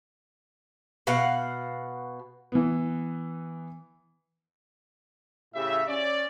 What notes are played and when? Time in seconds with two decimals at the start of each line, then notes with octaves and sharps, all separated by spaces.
1.07 B2 F5 F#5
2.52 E3 B3
5.54 A2 C#3 E4 G4 E5
5.88 C#4 D5